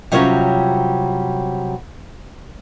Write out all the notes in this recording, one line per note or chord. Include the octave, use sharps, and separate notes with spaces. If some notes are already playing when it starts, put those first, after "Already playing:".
C3 F#3 G3 C#4 F4 C#5